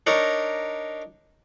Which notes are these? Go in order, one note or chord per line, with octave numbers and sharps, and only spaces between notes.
D4 D#4 A#4 C#5